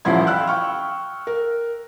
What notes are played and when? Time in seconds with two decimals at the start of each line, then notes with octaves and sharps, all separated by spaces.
0.05 D#1 A1 F3 E4 C6 G#6
0.27 F5 G5 B5 E6 F#6
0.47 G5 C#6 F6
1.27 A#4